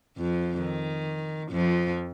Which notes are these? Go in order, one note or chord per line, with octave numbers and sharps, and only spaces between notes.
F2 F3
D#3
F2 F3